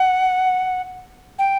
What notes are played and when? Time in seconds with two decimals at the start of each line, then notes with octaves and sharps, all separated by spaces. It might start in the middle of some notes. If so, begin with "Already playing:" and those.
Already playing: F#5
1.39 G5